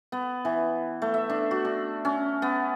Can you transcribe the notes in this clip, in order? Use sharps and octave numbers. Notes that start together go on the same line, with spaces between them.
B3
E3
A3
E5
D4
F#4
D4
C#4
B3